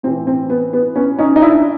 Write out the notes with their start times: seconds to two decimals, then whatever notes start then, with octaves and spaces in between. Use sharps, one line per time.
0.03 A2 C4
0.07 E3
0.27 C4
0.50 B3
0.73 B3
0.95 B3 C#4
1.19 C#4 D#4
1.36 D#4
1.41 D4 E4